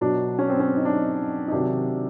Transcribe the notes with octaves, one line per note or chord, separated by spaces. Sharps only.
B2 F#3 D4
C#4
C4
C#4
D#4
D4
D#4
D#4
C3 D#3 F#3 D4